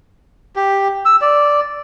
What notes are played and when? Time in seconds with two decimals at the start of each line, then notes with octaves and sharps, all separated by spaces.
0.56 G4
1.05 E6
1.21 D5